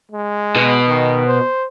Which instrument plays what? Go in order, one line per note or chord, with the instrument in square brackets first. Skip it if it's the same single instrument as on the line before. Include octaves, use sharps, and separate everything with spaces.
[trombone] G#3
[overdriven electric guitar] B2
[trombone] D#3
C5